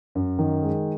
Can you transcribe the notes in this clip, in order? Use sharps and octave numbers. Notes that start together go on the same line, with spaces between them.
F#2
D#3
G#3